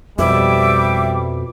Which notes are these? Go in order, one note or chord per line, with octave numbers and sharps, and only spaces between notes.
F2 B2 G3 E5 D6